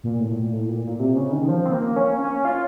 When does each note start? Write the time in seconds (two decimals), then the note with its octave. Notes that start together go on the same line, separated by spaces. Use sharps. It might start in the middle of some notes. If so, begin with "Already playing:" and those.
0.04 A#2
0.20 A2
0.36 A#2
0.53 A2
0.68 A#2
0.84 A#2
1.00 C3
1.16 C#3
1.32 D#3
1.48 F3
1.66 C4
1.73 A#3
1.96 C#4
2.21 C#4
2.45 F4